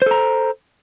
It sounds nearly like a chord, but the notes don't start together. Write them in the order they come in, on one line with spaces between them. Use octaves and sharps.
C5 A4 A#5